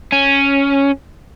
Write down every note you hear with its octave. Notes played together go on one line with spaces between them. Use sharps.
C#4